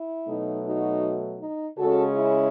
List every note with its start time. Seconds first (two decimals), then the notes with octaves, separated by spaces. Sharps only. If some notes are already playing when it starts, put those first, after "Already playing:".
Already playing: E4
0.27 B2 F#3 A3 D#4
0.65 D#4 F#4
1.40 D#4
1.77 C#3 G#3 C#4 F#4 A4
2.15 E4